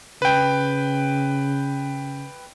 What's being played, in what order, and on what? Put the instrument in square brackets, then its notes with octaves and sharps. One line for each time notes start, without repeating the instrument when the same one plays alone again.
[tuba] C#3 [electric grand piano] B4 G5